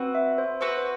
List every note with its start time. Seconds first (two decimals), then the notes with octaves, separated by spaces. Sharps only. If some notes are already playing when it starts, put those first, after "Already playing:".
Already playing: C4 F#4 B4
0.15 E5
0.38 C5
0.61 C4 F#4 B4 C5 F#5
0.77 C5